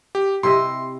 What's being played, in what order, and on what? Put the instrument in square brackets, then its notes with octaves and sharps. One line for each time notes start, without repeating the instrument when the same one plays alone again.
[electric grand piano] G4
[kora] C3 E4 D#5 [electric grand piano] C6